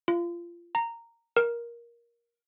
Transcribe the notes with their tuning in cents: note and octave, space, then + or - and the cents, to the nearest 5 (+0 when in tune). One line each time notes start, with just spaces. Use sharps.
F4 -25
A#5 -10
A#4 +15